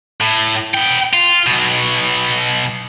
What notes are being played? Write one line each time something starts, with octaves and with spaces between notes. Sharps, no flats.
A2
B3 G5
F4
B1 B2